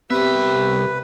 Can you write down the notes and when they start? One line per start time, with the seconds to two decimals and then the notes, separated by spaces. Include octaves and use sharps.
0.10 C2 B3 C4 G4 B4 E5